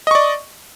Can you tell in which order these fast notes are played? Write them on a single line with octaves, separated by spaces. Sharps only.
D#5 C#6 D5